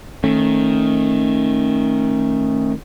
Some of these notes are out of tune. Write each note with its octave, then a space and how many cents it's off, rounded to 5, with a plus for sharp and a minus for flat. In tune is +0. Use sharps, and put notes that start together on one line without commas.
D#3 +0 A3 +0 C#4 -40